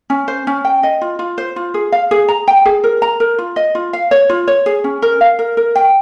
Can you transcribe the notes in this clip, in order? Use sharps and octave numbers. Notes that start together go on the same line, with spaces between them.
C#4
C5
C#4
G5
D#5
F4
F4
C5
F4
G#4
F5
G#4
A#5
G5
G#4
A#4
A#5
A#4
F4
D#5
F4
F5
C#5
F4
C#5
G#4
C#4
A#4
F5
A#4
A#4
G5